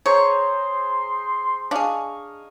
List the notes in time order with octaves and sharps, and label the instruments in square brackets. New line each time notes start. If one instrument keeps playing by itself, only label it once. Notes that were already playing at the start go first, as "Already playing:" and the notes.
[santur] G#4 C5 A#5 [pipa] C#5 [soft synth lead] C6
[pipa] D4 G#4 [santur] D#5 F5 C#6